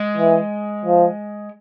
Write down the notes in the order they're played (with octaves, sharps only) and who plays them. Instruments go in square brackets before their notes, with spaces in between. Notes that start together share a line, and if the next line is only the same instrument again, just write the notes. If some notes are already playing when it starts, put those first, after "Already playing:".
Already playing: [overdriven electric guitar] G#3
[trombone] E3
F3